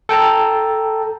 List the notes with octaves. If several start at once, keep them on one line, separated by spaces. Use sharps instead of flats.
A4 G5 A5 A#5